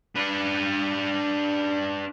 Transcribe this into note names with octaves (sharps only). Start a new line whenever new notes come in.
D4 B4